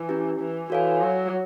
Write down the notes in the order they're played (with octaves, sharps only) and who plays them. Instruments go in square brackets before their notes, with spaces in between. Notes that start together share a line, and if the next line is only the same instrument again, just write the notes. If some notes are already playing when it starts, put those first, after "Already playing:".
Already playing: [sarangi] E3
[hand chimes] C#4 E4 G4
[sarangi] E3
[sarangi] E3 [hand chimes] F#4 A4 C#5 F5 G#5
[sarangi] F#3